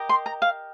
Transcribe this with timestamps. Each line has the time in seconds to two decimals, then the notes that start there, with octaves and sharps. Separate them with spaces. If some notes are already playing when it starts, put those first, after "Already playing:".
Already playing: G4 A#4 D#5
0.09 C6
0.26 A#5
0.42 F5